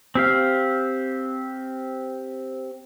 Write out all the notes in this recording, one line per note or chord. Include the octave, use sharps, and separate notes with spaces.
C4 G4 F5